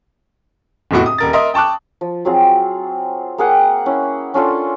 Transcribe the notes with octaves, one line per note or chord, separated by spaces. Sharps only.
F1 E2 A2 F#4
D#6
D#1 A#4 A6
A#4 D#5 E5 A#5 C6 D#6
G5 A5 C#6 D6 F#6
F3
F#3 C4 F4 G#4
A#3 G#4 F#5 G5
C#4 E4
C#4 D4 F4 A4